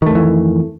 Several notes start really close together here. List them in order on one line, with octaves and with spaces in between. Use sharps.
D#3 A3 F2 E3